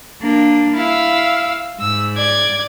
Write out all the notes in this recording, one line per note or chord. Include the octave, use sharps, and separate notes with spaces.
A#3 D4
E4 F5 E6
G#2 E6
D5 G#6